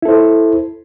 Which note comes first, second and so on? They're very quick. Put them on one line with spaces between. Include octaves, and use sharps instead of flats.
E4 A4 C5